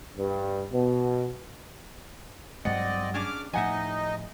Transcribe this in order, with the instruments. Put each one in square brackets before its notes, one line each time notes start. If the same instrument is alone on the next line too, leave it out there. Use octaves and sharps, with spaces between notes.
[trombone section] G2
B2
[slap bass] G2 F#3 G#3 [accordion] C4 D5 D#5 [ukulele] F#5
[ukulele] C#4 D4 G#4 [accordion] D6 F6
[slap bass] A2 F3 [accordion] D#4 D#5 [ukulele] E5 F#5 G#5